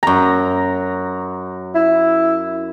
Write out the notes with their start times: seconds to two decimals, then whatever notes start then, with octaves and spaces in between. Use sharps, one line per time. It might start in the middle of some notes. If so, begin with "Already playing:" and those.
0.03 F#2 A#5
1.75 E4